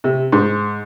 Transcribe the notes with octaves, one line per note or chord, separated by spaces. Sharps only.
C3
G#2